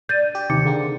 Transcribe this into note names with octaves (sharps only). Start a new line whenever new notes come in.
D4 G6 A6 D#7
G4
D#2 C3 D#4 D6 C#7
D3 A#3 C4 G#4